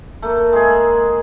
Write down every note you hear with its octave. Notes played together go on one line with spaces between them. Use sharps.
A3 A#3
G#3 G#4